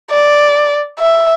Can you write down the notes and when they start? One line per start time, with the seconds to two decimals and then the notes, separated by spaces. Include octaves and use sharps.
0.11 D5
0.99 E5